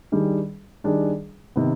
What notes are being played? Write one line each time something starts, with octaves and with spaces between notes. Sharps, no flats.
D#3 G3 D4 G#4
D#3 G3 D4 G#4
C3 D#3 B3